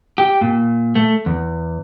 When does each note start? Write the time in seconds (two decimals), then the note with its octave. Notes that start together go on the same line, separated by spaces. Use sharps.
0.18 G4
0.41 A#2
0.95 A3
1.26 E2